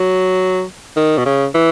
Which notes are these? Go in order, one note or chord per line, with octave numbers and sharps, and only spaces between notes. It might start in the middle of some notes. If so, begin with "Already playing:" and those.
Already playing: F#3
D#3
B2
C#3
E3